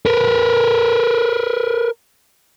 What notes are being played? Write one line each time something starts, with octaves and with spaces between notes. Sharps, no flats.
A#4 B4